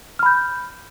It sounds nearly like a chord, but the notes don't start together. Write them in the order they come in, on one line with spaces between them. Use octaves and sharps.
F6 B5 G6